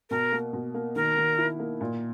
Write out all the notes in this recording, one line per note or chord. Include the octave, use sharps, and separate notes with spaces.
B2 A#4
A#3
B2
A#3
D#3 A#4
D#3
E4
A#3
A#2